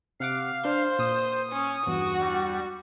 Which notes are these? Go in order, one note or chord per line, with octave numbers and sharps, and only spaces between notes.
C3 F5 F#5 D6
D4 C5
A#2 D#6
C#4
E2 G2 F#4
G3